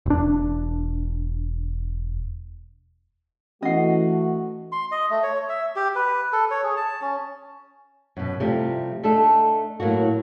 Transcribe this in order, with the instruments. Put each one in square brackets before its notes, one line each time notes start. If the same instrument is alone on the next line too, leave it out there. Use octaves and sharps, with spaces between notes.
[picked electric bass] E1 D4
[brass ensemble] E3 A3 [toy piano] C#4 F#5 [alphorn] F#4 [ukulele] D#5
[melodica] C6
D#5
A3
C#5
E5
G4
B4
A4
C#5
G#4
A5
C#4
[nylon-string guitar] F#2 B2
C3 F3 G3 A3 G4
A3 D4 D#4 A4
A2 F#3 A#3 F#4